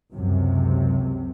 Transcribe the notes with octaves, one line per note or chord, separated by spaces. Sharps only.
C#2 F#2 C3